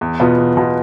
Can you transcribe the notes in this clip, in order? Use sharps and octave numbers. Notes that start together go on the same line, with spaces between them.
E2
B2 B3 F4
E2
B2 B3 F4